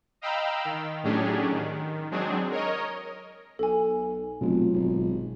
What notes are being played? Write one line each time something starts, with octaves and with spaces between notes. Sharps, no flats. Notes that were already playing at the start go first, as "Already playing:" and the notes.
D#5 F5 G5 A#5 B5 E6
D#3
A2 F#3 C#4 D4 G4 G#4
D#3
F#3 G#3 C4 D4 G#4
A#4 C#5 D#5
B1 A4 G#5
F1 B2 F#3 F4
G#1